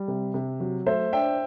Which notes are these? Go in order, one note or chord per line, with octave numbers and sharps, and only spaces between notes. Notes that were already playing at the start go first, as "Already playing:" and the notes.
Already playing: G3
C3
C3
F#3
A3 C5 E5
D4 E5 G5